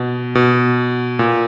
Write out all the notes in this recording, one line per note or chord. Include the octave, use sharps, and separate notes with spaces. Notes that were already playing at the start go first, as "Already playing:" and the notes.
Already playing: B2
B2
A#2